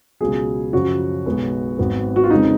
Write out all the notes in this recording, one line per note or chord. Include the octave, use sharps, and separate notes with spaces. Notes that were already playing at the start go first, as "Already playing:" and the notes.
C#2 B2 F#3 G#4
F#2 C#3 F3 F#4
B1 B2 G#3 B3
G#1 G#2 F#3 B3
F#4
F4
F2 C#3 G#3 B3 D#4